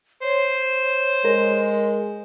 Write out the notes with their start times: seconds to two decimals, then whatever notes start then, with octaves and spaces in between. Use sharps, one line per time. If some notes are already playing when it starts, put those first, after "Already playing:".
0.23 C5 C#5
1.25 G#3 A#4